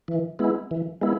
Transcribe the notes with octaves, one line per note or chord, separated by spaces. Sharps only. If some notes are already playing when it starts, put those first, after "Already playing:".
E3
G#3 B3 E4
E3
G#3 B3 E4